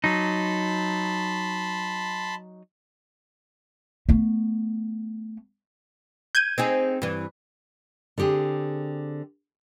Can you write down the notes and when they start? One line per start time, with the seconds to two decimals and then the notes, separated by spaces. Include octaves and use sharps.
0.04 F#3 D#4 A5 B5 C6
4.09 A3 B3
6.35 G6 G#6 D#7
6.58 C4 D#4 G#4
7.02 G2 E3
8.18 D3 C4 G4 G#4